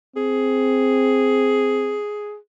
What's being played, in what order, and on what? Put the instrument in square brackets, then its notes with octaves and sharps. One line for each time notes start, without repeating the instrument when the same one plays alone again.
[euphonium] C4 [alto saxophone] G#4